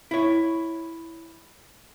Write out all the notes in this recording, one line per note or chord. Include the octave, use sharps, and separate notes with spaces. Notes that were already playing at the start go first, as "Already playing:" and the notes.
E4 C#5